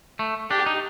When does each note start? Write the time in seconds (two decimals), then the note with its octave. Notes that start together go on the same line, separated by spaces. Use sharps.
0.19 A3
0.50 D4 G4
0.66 D#4